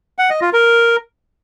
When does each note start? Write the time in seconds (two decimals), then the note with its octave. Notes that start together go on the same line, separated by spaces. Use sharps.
0.19 F#5
0.30 D#5
0.41 F4
0.53 A#4